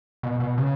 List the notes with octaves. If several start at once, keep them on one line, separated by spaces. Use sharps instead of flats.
B2
B2
C#3